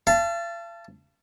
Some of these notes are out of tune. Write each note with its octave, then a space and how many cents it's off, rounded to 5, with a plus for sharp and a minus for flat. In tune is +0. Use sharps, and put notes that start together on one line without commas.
F5 -45 A5 +0